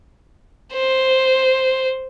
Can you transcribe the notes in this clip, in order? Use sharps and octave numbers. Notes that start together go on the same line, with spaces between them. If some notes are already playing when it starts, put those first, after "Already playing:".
C5